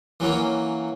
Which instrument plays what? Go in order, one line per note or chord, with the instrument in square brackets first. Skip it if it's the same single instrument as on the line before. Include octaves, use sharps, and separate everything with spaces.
[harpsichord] E3 F#3 A#3 C#4